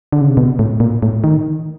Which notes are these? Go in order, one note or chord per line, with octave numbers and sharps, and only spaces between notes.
D3
C#3
C3
B2
A2
A#2
A2
D#3